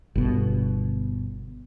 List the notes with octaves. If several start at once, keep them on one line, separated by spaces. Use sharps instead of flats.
G1 B2